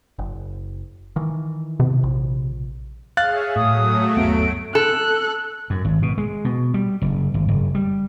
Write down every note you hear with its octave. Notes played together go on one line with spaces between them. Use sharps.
F#1
D#3 E3
C3
A#1
G#4 C#5 E5 F5 F#6 A6
A2 F#3 A3 D#6
G1 D#2 B3 D7
A4 F#6
F#2
G#1
B2
G#3
B2
G3
F#1
G#1
F#1
G3